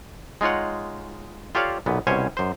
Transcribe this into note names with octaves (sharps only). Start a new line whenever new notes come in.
G#3 D#4 F4 C#5 F#5
F4 G4 A4 C#5 D5 F5
B1 A#2 B3
C2 B2 C#4 C5 C#5 G#5
F#2 C5